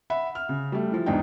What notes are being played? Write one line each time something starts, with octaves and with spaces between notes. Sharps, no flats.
E5 F#5 B5
F6
C#3
G3 A3
E3 F3
E2 G#2 D4 D#4 G5